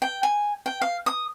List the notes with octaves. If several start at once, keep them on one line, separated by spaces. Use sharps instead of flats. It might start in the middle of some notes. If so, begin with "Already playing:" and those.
G5
G#5
G5
F5
D#6